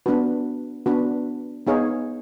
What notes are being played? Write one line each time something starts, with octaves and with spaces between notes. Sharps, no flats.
B3 D4 F#4 B4
B3 D4 F#4 B4
B3 D#4 G#4 C#5 F5